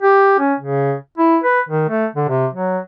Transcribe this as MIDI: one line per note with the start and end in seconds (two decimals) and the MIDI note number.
0.02 0.35 67
0.39 0.54 61
0.60 0.95 49
1.18 1.38 64
1.44 1.61 71
1.69 1.88 51
1.89 2.06 57
2.15 2.28 50
2.28 2.47 48
2.53 2.79 54